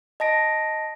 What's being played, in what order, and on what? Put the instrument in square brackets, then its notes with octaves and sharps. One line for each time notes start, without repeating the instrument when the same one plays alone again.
[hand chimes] D#5 A5 A#6 D7